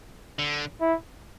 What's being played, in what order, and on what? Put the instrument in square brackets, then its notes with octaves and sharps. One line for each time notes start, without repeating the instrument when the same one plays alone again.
[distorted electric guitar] D3
[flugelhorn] E4